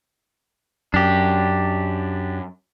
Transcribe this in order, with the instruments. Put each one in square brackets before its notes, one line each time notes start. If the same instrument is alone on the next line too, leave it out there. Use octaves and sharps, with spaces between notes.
[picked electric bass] F#2 [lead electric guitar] D4 G4